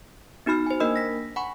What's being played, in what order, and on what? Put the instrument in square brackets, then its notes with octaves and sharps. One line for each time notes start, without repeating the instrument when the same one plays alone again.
[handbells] B3 D#4 F#4 B5 F6
C5 G#5
A#3 D4 A#4 D#5 B5 E6
A#6 B6
F#5 G#5 B5 C#6